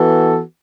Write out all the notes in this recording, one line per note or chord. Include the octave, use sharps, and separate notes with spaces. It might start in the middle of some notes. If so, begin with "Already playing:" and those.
Already playing: E3 B3 F#4 A4